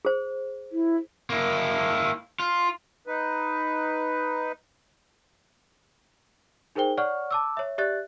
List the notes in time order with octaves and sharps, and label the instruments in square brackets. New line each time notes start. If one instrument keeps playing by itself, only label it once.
[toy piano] G#4 C5
[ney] E4
[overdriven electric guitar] A#3 E4
F4
[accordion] D#4 B4
[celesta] D#4 G#4 A#4 C5 G5 G7
C#5 D5 F#5 C#6 F6
A5 D6 E6
C#5 E5
G4 D5 E5 F#6 A6